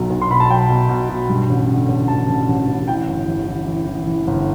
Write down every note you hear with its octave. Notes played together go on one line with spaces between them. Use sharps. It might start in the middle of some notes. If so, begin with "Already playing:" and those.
Already playing: B1 F#3
B1
C6
B2 B5
A5
F#3 G5
B2
B2
B2
G2
A1
D3
A1
A1 A5
A1
A1
A1
E3 G5
G1
E3
E3
E3
E3
E3
G1